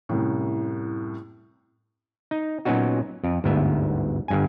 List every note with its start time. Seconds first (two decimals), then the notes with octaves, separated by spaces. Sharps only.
0.09 C2 F#2 A2
2.31 D#4
2.65 A#2 F#3 B3 C#4 D#4 F#4
3.24 F2
3.44 G1 D2 G#2 B3 E5
4.28 G1 G2 G#5